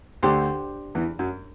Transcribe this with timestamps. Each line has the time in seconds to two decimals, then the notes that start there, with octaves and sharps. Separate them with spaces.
0.23 D2 D3 D4 G4 C5
0.95 E2 E3
1.19 F#2 F#3